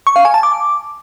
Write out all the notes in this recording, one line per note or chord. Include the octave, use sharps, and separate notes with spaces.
C#6
F5
G#5
A5
D6